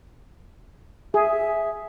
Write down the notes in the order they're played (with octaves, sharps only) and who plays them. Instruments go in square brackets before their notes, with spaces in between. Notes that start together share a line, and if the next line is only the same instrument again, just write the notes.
[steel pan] G#4 [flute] E5